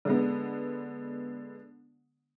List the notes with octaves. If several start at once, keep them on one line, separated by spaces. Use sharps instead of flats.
D3 G#3 B3